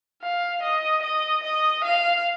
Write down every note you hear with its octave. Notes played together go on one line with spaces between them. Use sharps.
F5
D#5
D#5
D#5
F5